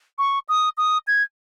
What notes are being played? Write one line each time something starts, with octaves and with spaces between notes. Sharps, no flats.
C#6
D#6
D#6
G#6